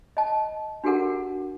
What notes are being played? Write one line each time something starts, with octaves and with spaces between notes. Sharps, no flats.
D#5 A5
D4 F#4 G4 A4 A#4 F#5